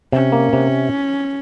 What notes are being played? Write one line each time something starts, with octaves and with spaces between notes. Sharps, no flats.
C3 C#4
A#3
C3